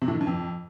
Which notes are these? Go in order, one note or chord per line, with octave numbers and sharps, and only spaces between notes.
C3
A2
D#3
G2
F2